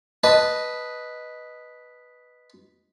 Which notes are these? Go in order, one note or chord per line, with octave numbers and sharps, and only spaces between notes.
B4 D#5 A5